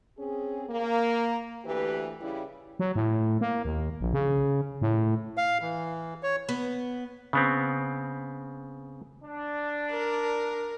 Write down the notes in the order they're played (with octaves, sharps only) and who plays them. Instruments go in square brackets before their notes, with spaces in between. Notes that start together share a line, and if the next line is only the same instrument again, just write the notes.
[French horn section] C4 C#4 G#4
A#3
D2 E3 G4 B4
C#3 G3 E4
[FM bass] F#3
A2
A#3
D#2
A#1
C#3
A2
[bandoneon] F5
E3
C#5
[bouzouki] B3
[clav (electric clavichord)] C#3 B3 C4
[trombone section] D4
[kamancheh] A#4